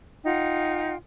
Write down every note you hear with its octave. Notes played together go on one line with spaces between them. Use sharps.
D#4 F4 F#5 G5